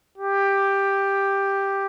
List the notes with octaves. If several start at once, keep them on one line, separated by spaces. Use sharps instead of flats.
G4